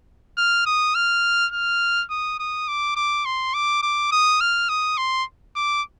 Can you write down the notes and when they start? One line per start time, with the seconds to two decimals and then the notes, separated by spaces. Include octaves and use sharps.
0.37 F6
0.66 D#6
0.95 F6
1.52 F6
2.10 D#6
2.39 D#6
2.68 D6
2.96 D6
3.26 C6
3.54 D6
3.83 D6
4.12 D#6
4.41 F6
4.69 D#6
4.98 C6
5.56 D6